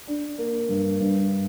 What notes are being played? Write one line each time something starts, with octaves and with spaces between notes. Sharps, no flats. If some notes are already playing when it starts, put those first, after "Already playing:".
D4
A#3
G2
G2